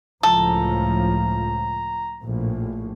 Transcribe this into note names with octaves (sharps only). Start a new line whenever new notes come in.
C#2 A2 F3 A4 A#5
A#1 A2